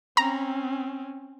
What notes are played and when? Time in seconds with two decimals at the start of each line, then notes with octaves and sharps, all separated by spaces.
0.17 C4 C#4 A#5